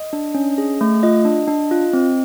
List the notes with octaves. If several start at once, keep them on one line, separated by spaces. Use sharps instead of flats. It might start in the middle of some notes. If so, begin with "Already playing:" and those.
Already playing: D#5
D4
C#4
G#4
A3
F4 D#5
D4
D4
F4
C4